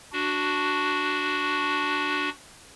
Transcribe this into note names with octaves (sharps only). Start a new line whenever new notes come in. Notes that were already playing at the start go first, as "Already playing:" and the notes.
D4 F#4